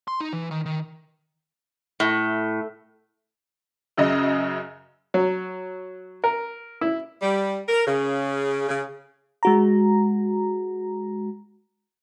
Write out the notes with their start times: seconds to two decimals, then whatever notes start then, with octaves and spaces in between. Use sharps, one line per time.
0.08 C6
0.20 D#4
0.33 E3
0.51 D#3
0.65 D#3
2.00 A2
3.97 F#2 C#3 D#5
5.14 F#3
6.24 A#4
6.81 E4
7.22 G3
7.69 A#4
7.87 C#3
8.69 C#3
9.43 G#3 F#4 A#5